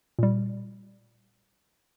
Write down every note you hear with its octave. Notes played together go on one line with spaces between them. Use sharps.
A#2 G3